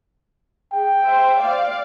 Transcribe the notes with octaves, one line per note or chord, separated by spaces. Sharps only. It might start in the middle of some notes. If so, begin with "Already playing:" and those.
G#4 G5
C5 E5
D5 F5